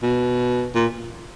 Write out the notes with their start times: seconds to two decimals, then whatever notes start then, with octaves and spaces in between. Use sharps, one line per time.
0.03 B2
0.75 A#2